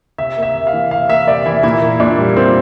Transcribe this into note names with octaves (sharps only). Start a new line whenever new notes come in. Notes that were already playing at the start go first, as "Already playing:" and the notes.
C3 E5
A#3
E5
C3
F5
E3
C3 F5
A#3 E5
C3 D5
E3 E4
A#2 E4
A#3
A#2 D4
G3
A#2 C4